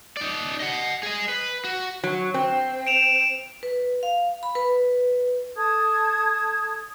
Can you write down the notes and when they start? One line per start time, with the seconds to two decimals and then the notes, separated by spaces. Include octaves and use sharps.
0.17 D#4 D5
0.60 D#5 F#5
1.03 G#4 D#5
1.29 B4
1.65 F#4
2.04 F#3
2.34 C4
2.87 D7 E7 F7
3.63 B4
4.03 F5
4.43 B5
4.55 B4
5.56 A4 A5 D#6 G#6